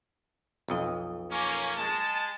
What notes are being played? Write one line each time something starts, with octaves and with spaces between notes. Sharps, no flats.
B1 F2 D#5
A#3 C#4
G#3 A5